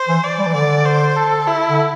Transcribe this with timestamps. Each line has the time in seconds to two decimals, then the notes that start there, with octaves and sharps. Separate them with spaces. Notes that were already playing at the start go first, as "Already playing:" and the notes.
Already playing: C5
0.08 E3
0.24 D5
0.38 G3
0.46 E3
0.54 D3 D5
0.85 C5
1.16 A4
1.47 E4
1.68 D3